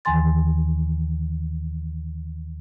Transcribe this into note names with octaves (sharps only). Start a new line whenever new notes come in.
D#2 D#3 E3 G#5 C6 A6